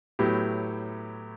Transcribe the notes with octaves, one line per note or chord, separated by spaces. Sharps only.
A2 F#3 B3 E4 G4